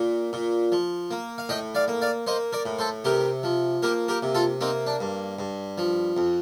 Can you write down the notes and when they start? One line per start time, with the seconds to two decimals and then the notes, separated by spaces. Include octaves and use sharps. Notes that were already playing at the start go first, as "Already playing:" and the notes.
Already playing: A#2
0.33 A#2
0.72 F3
1.11 A#3
1.38 F5
1.49 A2 D#5 G5
1.75 D5 F5
1.88 A#3
2.02 D5 F5
2.27 A#3 C5 D#5
2.53 A#4 D5
2.66 A2
2.79 A4 C5
3.05 C3 G4 A#4
3.43 F3
3.83 A#3 G4 A#4
4.08 G4 A#4
4.23 C3
4.35 F4 A4
4.61 A#3 C4 D#4
4.87 D4
5.00 G2
5.39 G2
5.78 F3
6.17 F2